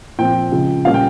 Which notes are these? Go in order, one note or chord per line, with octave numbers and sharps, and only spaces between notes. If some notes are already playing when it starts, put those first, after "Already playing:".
A#2 F3 C4 G5
C#3 F3 G#3
A#2 G3 A#3 C#4 F5
G5